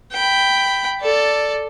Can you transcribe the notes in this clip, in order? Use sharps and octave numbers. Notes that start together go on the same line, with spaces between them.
G5 B5
A4 D5